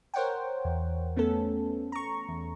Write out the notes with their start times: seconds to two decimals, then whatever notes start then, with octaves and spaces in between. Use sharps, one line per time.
0.14 A#4 C5 C#5 F#5 G5
0.65 E2
1.16 A3 B3 C#4 A4
1.92 A#5 C#6
2.29 E2